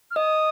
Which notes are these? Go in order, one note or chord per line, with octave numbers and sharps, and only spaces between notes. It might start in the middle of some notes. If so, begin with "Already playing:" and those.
F6
D#5 D#6